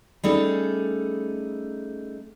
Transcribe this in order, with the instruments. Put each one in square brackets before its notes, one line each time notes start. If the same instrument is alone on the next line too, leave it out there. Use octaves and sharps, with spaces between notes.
[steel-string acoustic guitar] G3 A3 C#4 D#4 G#4 A4